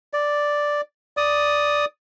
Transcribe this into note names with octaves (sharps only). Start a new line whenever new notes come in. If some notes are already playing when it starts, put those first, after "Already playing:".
D5
D5 D#6